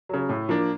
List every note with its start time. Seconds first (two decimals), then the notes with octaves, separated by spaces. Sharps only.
0.09 C#3 F#3
0.29 A2
0.49 F3 A#3 D4